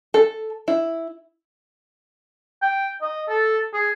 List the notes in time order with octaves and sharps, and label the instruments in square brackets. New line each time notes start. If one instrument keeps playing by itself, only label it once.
[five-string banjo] A4
E4
[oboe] G5
D#5
A4
G#4